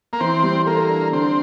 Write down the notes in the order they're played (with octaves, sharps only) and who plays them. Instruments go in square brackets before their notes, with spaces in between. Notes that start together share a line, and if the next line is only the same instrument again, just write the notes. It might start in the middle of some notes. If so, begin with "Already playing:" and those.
[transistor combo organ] A#3
[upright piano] E3 [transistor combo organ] C4
[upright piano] G3
[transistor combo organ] A#3 [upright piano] A4
[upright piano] D4
[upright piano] D3 [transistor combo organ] C4